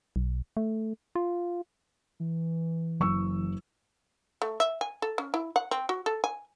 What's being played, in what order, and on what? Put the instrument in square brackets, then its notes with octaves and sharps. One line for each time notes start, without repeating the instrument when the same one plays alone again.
[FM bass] B1
A3
F4
[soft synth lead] E3
[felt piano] F#1 C#6 E6
[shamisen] A3
E5
G#5
A4
C#4
E4
F#5
C4
F#4
A4
G#5